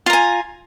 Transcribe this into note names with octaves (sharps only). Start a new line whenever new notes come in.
F4 G#5 A#5